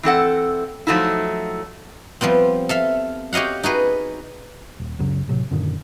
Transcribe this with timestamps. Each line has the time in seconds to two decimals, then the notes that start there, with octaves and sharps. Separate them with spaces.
0.03 E3 C4 A4 F#5
0.87 F3 F#3 A3 D#4 E4
2.21 F3 G3 B3 C4
2.69 A4 E5 F5
3.33 G4 C#5 D#5 F5 F#5
3.63 D#4 F#4 G#4 B4
4.80 D#1
4.99 C#2 F#2 C#3 F#3
5.28 A2 C3 F#3
5.51 F#2 A#2 D3 D#3